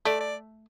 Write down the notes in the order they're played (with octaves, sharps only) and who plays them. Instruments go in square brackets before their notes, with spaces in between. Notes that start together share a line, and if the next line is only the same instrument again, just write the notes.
[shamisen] A3 [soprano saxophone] D5
[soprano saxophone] D5